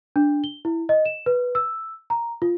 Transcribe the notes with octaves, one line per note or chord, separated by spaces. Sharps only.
D4
G7
E4
D#5
E7
B4
E6
A#5
F4